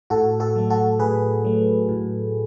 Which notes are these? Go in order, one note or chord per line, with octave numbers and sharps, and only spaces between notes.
A2 F#4 A4
F#4 A4
F#3 A3
F#4 A4
A2 G#4 B4
F#3 A3
A2